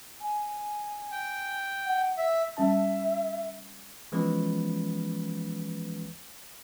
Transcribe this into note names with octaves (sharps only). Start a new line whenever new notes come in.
G#5
G5
F#5
E5
G3 C#4 E5 A5
E3 F3 G#3 B3 C#4 B4